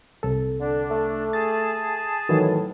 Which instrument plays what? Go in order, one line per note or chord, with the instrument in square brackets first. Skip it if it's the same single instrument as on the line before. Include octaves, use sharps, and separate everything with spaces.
[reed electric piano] C2 A4
[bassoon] D3 [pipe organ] D4
[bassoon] A3
[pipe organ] G#4 A5 [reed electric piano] A6
[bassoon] A2 [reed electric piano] D#3 E3 F#3